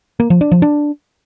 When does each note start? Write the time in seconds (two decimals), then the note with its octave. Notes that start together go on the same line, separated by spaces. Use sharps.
0.20 A#3
0.30 F3
0.41 D4
0.52 F3
0.62 D4